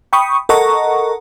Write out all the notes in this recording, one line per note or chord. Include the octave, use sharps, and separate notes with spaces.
G5 B5 C#6 D#6
A4 A#4 D#5 F#5 A#5 C#6